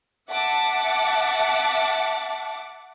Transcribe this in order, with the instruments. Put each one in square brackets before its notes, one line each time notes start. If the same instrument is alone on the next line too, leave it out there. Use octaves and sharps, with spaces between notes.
[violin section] E5 F#5 A5 D6